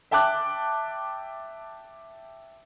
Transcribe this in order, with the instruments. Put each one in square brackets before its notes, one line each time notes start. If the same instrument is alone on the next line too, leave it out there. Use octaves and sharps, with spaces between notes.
[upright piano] E5 G5 A5 D6 F#6